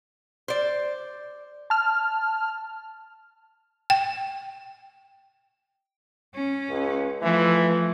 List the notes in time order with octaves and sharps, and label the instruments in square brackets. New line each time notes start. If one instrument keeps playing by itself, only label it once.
[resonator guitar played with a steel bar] C5 D5
[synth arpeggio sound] A5 F6
[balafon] G5
[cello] C#4
[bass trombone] C#2
[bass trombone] E3 [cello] F3 A3